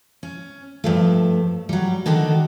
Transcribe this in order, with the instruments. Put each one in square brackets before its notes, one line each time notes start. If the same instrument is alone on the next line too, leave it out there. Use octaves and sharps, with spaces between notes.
[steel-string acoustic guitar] C#4
G2 F3 A3
F#3 G3
D3 D#3 D4 F#4 A4